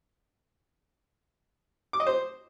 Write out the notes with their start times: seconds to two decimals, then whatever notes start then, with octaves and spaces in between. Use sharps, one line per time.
1.93 D6
2.00 D#5
2.07 C5